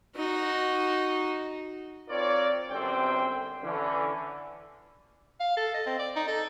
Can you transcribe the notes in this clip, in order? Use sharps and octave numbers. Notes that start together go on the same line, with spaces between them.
D#4 F#4
C4 F4 A#4 C#5 D5
G1 F#2 D3 G3 C4 G5
D3 E3 C#4
F5
A4
D#5
C4
D5
D#4
A4